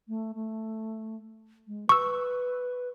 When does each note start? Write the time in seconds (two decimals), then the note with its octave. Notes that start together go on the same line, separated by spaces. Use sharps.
0.08 A3
0.35 A3
1.68 G#3
1.89 B4 C#6 E6